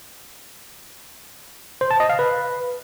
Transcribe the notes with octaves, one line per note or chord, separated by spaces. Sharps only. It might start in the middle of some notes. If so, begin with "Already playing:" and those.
C5
A5
D#5
F5
B4